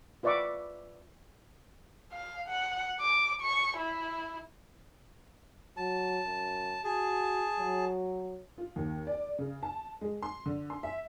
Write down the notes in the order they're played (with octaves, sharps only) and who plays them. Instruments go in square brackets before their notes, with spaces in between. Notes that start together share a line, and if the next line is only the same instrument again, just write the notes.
[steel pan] F4 B4 D5 E5 C#6 D6
[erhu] F5
F#5
D6
C#6
E4
[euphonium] F#3 [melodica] A5
[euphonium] F#2
[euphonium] F#4 [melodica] G#4 A5
[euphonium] F#3
[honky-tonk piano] F4
D#2
D5
C#3
A5
G#3
C6
D3
C6
E5